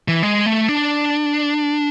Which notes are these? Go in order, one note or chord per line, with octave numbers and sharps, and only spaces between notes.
E3
G#3
A3
D4